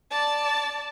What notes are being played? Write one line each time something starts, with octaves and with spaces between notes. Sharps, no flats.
D5 A5